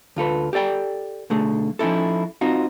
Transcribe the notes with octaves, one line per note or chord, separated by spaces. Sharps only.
D2 F4 A4 B4
G4 A4 D5 G5
B1 D3 A3 G#4
F3 C#4 D#4 E4 A4
C4 D#4 F4 F#4